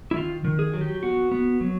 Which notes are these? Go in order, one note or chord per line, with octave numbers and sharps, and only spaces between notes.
E4
D#3 F4
D#3
G#4
F#3
G4
B3 F#4
B3
F#3